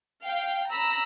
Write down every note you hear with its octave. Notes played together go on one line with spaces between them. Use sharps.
F5 G5
A#5 B5 E6